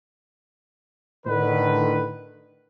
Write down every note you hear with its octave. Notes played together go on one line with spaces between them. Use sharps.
A2 D3 D#3 B4